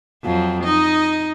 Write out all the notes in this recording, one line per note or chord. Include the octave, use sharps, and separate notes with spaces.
F2 F3 F#3
D#4 D#5